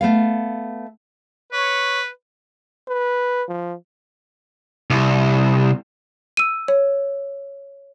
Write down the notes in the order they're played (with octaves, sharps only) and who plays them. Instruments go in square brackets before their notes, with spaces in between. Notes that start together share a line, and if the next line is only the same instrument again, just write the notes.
[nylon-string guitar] A3 B3 F5
[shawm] B4 [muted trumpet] C#5
[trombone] B4
F3
[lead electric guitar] C2
[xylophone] E6 D#7
C#5